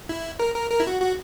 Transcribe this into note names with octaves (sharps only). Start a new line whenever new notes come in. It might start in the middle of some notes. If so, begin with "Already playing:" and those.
E4
A#4
A#4
A#4
E4
F#4
F#4